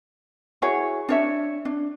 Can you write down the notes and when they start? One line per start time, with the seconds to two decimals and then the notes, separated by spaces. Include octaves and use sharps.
0.62 E4 F#4 G#4 C#5
1.09 D4 C#5 E5
1.65 D4